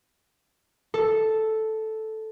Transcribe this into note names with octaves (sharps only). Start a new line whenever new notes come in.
A4